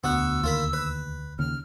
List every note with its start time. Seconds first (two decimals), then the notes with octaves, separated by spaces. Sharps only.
0.04 E1 D2 D3 B3 F#4 F#5 E6
0.44 D#2 F4 A#4 B5
0.73 B4
1.39 D#2 C#3 F6